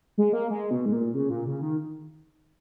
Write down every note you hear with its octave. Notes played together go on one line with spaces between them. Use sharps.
G#3
A#3
G#3
B2
G#2
A#2
C#3
A#2
C#3
D#3